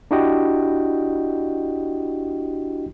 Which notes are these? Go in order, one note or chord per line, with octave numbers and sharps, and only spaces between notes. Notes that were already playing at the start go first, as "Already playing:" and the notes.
D4 E4 F#4 G4 D#5 G5